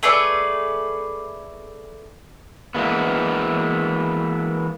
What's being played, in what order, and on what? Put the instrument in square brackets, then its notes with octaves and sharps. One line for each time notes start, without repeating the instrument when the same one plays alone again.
[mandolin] A3 G#4 B4 D5
[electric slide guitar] E3 G#3 A#3 B3